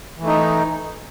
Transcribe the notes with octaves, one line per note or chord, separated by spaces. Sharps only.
E3 A3 D#4